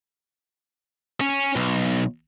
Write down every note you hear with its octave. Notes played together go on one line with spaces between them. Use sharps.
C#4
B1